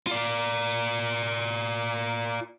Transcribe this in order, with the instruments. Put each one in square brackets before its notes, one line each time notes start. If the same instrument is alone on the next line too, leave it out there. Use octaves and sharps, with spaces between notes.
[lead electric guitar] F4 D5